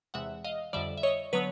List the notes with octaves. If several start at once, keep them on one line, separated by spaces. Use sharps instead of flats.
E2 C3 E3 G#3 E5 F#5
D#5 F5
F2 D3 G3 D5 E5
E5
C#5 D#5
D3 F#3 B3 B4 C#5